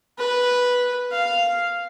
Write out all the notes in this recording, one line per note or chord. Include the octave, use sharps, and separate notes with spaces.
B4
F5